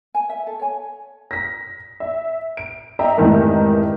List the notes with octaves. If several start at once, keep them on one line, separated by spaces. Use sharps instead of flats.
G#5
E5
A4
C#5 G#5
A#6 B6
E5
D7
D#5 E5 G5 A#5
F1 G#2 D#3 E3 A3 A#4